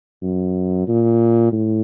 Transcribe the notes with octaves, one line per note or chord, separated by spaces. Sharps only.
F#2
A#2
A2